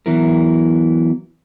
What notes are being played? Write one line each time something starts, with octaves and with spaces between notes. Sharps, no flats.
E3 F#3 B3 E4 A#4